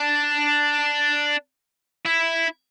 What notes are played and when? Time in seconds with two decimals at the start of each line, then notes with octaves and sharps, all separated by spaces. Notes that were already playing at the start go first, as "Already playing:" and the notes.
Already playing: D4
2.05 E4